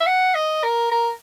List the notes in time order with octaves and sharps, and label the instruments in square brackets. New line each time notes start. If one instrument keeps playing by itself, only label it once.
[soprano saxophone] E5
F#5
D#5
A#4
A#4